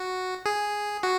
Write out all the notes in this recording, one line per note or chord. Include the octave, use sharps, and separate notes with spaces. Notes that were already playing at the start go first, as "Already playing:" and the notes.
Already playing: F#4
G#4
F#4